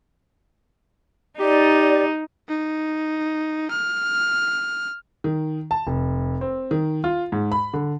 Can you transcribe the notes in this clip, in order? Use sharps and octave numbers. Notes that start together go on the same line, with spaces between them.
D#4 G4 D5
D#4
F6
D#3
A5
F1
C4
D#3
F4
G#2
B5
D3